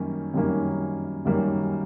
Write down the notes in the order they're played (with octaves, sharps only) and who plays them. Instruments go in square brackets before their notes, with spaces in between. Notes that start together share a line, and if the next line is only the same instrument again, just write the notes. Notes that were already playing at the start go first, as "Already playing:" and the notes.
Already playing: [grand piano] F#2 D#3 G3 A#3 C#4
F#2 D#3 G3 A#3 C#4
F#2 D#3 G3 A#3 C#4